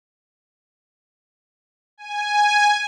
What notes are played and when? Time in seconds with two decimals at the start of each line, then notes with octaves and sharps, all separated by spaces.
1.98 G#5